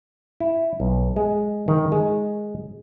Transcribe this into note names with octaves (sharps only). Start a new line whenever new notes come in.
E4
B1
G#3
D#3
G#3